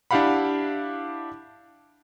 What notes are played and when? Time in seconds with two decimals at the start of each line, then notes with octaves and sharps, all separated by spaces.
0.11 D4 E4 G4 F5 F#5 B5